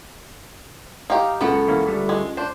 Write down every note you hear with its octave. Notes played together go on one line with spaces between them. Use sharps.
D#4 G4 F5
C#2 F#2 B3 A4 F#5
E3 A#3 C#4
D3 G3 A3
G#3
D4 C5